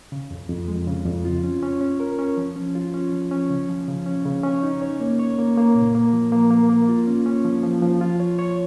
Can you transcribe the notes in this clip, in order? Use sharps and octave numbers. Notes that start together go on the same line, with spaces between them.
C#3
F2
F2
G#3
C#3
F2
F4
C#4
C#4
C#4
A#4
C#4
F3
C#4
F4
C#4
F3
C#4
C#3
F3
C#3
C#4
C#3
C#4
D#4
C#5
A#3
C#5
A#3
A#3
A#2
A#3
F3
A#3
A#3
A#3
F4
C#4
C#4
F3
F3
F3
F4
C#5
C#5